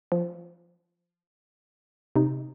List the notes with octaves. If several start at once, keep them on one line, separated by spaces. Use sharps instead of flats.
F3
C3 D#4